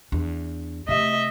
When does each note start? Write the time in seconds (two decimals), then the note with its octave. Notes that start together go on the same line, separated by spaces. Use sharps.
0.12 E2 D4
0.88 C3 A3 D#5 E5